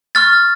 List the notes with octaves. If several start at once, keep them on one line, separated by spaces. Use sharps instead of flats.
C#6 F6 A6